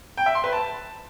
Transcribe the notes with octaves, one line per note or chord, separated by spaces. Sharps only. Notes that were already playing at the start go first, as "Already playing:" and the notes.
G5
E5
C6
B4
A5